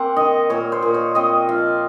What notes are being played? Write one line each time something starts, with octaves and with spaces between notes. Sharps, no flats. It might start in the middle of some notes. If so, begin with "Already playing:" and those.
Already playing: A#3 C4 F#5
D#3 D#5
A#2 C#5
C5
A#2
C#5
C4 D#5
F3 F5